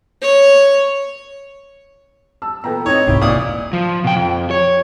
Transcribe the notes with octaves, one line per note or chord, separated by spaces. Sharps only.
C#5
A5 E6
A#2 E3 B3 A4 G5 A#5
A2 C4 D#4 C#5
E1 C2 G#2 D#3 E4 G4
A#2 E3 D5 F5 D#6
F3
B2 G5
F2
C#5